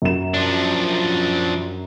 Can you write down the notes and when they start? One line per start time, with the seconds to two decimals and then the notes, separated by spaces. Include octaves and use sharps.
0.02 F#2 E7
0.34 F3 D4